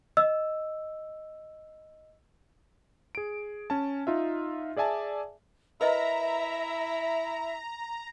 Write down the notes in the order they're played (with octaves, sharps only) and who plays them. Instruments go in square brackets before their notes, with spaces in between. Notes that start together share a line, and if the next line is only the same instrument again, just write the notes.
[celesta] D#5 E6
[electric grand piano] G#4 D7
C#4 G#5 A5
D#4 F4 E5
G#4 D5 E5 G#5 A5
[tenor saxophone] E4 [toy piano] A#4 B4 D#5 [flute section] E5 [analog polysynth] A#5